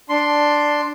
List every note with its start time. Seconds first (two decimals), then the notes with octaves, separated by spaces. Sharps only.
0.09 D4 C6